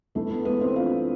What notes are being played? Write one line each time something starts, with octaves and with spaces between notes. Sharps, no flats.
E3 A3 A4
B3 B4
G#3 B3 B4
C4 C5
D4 F4 F5